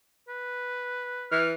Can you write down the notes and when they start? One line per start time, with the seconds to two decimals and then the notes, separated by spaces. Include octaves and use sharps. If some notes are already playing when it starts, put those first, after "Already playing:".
0.29 B4
1.32 E3 F6